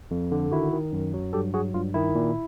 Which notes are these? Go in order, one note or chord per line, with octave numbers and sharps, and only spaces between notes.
F2
D3
D#3 E4 F#4
D#3
F#2
F#3
G2 G4 A4
F#3 F#4 G#4
G2 F4
D#3 E4
A#2